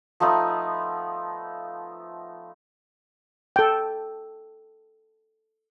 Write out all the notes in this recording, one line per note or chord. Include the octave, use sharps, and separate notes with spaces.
F3 A3 B3 D#4
A4 G5